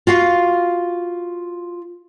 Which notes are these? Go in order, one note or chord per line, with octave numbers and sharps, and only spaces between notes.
F4 F#4 F5